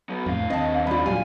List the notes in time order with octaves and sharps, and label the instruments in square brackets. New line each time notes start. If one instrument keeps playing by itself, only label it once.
[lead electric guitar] F#3 B3
[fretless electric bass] F2 A2 [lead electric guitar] D3 F5
[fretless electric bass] D#2 C4 [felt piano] D#5 A5
[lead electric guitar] F#2 D3 [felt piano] F4 D5 B5
[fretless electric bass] A#2 F#3 G3 [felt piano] F5 [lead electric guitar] G#5